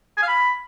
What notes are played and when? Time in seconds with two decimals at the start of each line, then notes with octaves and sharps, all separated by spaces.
0.17 G#5
0.22 F5
0.28 B5